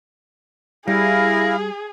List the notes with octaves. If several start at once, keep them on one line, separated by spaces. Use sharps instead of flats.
G3 E4 G#4 A#4 F5